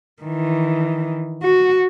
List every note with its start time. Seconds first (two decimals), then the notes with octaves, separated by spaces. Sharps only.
0.22 D#3 E3
1.43 F#4